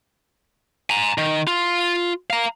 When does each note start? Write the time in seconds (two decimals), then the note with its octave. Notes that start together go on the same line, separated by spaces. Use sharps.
0.90 G#5 A#5
1.18 D#3
1.47 F4
2.30 F5 A#5